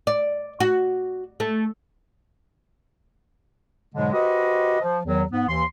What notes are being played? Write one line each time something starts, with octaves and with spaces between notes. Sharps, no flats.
D5
F#4
A3
G#2 B2 D3 F#3 G#3
F#4 G4 B4 C5 D#5
F3
E2 D#3 F#3
G#2 B3
D#2 E3 C6